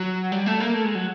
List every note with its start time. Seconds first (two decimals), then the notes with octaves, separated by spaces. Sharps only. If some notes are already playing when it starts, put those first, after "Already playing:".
Already playing: F#3
0.32 G3
0.46 A3
0.60 A#3
0.74 A3
0.85 G#3
0.95 F#3